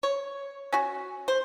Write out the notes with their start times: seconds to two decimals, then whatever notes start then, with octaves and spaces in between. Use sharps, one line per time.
0.03 C#5
0.72 C#4 F#4
1.28 C5